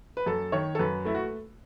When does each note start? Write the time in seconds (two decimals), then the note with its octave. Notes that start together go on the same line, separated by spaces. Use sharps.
0.17 B4
0.26 F#2 A4
0.52 D#3 C#5
0.75 A4
0.79 F#2 B4
1.05 A3 E4
1.15 F#4